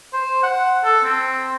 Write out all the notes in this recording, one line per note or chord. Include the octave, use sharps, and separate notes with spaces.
C5
F#5
A4
C4